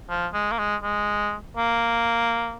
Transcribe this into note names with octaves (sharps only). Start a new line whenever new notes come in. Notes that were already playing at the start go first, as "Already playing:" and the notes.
F3
G#3
A#3
G#3
G#3
A#3